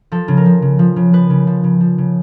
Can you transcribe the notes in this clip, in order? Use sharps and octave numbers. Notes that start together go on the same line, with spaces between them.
F3 A4
C#3
A#4
F3
C#3
F3
C#3
F3 B4
C#3
F3
C#3
F3
C#3